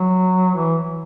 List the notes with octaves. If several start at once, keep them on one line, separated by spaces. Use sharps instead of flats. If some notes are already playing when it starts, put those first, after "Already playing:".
Already playing: F#3
E3